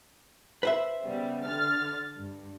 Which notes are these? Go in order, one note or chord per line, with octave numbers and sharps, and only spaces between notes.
B4 C5 E5
C#3 G3 B3
D3 F6 A6
G2